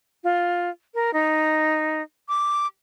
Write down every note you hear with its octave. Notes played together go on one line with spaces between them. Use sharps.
F4
A#4
D#4
D6